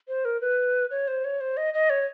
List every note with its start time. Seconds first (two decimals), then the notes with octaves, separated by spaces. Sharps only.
0.08 C5
0.25 A#4
0.41 B4
0.91 C#5
1.08 C5
1.24 C#5
1.40 C5
1.57 D#5
1.74 D#5
1.90 C#5